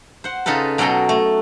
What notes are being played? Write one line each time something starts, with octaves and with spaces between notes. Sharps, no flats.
C5 F#5
C#3 D#4 F4 A4 B4
B2 F#3 G#4 A4 D#5 G5
A3